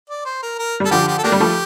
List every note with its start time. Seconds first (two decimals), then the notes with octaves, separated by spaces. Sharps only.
0.10 D5
0.25 C5
0.42 A#4
0.59 A#4
0.80 G3 A4
0.91 D3 F3 G4
1.07 G4
1.18 A4
1.24 A3 A#3 D4 G4
1.32 G3
1.40 F3 A3